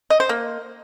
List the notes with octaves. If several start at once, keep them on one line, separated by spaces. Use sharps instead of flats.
D#5
C5
A#3